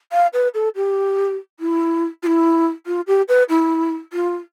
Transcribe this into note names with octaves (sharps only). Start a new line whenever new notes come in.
F5
B4
A4
G4
E4
F4
E4
F4
G4
B4
E4
F4